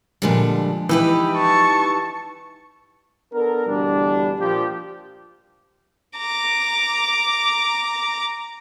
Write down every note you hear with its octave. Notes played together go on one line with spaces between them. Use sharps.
A#2 D3 F3 G3 G#3
E3 D#4 G4 B4
A5 C#6
B3 D4 A4 A#4
D2 B2 E3 G3 D4
A#2 F3 F4 G4
A#5 D6